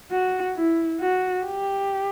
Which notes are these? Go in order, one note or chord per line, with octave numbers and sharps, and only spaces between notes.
F#4
E4
F#4
G4